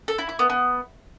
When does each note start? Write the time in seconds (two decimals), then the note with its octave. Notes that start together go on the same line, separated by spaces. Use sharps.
0.08 A4
0.18 E4
0.29 E4
0.39 B3
0.50 B3